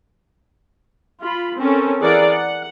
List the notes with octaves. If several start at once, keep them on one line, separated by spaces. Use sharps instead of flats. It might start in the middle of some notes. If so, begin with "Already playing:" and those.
F4 B5
C4 C#4 A4 A#4
E3 G#4 A#4 D5 F#5 A#5
F#5